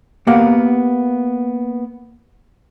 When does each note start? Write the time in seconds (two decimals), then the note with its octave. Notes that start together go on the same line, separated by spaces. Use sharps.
0.27 A#3 B3 G4 F#5